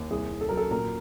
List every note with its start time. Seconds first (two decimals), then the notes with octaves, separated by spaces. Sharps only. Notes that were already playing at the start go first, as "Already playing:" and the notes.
Already playing: D#2
0.10 C2 G#4
0.31 C2
0.41 A4
0.49 F#3 A#4
0.57 A4
0.71 A#2 A#4